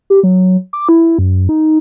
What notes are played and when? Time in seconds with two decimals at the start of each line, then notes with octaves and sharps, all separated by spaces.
0.10 G4
0.23 F#3
0.73 D6
0.89 E4
1.19 F#2
1.49 D#4